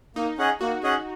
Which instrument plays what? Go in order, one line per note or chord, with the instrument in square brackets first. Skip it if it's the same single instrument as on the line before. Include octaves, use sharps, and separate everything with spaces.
[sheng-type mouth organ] A#3 [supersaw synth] D#4
[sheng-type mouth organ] C#4 G#4 D#5 F#5
[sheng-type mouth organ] A#3 [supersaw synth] F#4
[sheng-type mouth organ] C#4 G#4 D#5 F#5